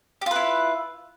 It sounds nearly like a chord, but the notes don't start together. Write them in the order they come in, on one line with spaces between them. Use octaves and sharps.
G4 F4 B4 E4